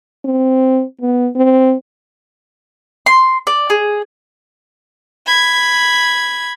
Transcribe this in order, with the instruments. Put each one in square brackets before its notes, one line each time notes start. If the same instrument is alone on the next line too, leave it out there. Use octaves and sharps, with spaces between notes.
[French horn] C4
B3
C4
[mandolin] C6
D5
G#4
[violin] B5 G#6